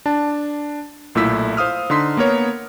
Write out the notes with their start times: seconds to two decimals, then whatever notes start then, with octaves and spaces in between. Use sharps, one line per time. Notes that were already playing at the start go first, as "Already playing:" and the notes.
0.06 D4 A5
1.15 B1 A#2 A3 E4 E6 B6
1.57 C5 F5 D#6 F6
1.90 D3 D#4 C6 B6
2.17 A#3 B3 A#4 C#5